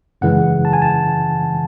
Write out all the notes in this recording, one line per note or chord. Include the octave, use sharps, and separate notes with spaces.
F#2 C#3 E3 G#3 F#5
A5
G#5
A5